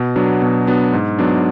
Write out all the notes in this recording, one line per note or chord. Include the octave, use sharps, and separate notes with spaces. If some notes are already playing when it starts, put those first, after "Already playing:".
Already playing: B2
F#3 B3 D4
B2
F#3 B3 D4
G#2
F#3 B3 D4